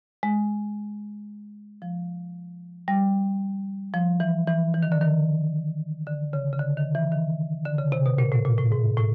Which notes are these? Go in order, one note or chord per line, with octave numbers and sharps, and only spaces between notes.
G#3
F3
G3
F3
E3
E3
E3
D#3
D3
D#3
D3
C#3
C#3
D3
D#3
E3
D#3
D3
C#3
C3
B2
A#2
A2
A#2
A2
G#2
A2